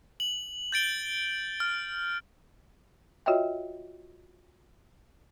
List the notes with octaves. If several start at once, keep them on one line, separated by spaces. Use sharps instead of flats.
F#7
G6 A6 D7 G7
F6
F4 F#4 C#5 D#5 E5 G5